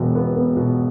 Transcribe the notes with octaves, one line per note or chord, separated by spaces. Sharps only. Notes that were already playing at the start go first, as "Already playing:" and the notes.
Already playing: E1 B2
B3
B3
B2